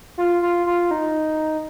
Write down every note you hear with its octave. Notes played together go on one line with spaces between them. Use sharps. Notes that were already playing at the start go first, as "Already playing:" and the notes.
F4
F4
F4
D#4